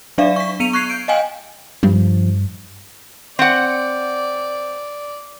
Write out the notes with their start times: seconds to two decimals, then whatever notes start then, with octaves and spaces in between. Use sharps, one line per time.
0.18 F#3 D4 D5 E5 F5
0.36 C#6 B6
0.60 B3 C#7 D#7 F7
0.73 C#6 F#6 G#6 C7
0.90 G6 D7
1.08 D#5 F5 G5 G#5
1.83 G2 F3
3.39 C4 D5 F#5